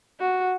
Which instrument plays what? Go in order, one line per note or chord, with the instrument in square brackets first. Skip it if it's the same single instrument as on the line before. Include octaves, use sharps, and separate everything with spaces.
[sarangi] F#4